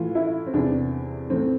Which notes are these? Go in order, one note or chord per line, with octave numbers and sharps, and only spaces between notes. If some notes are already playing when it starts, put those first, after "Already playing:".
Already playing: A2 E3 F4
E4
C4
E2 C3 E3 D4
A2 E3 C4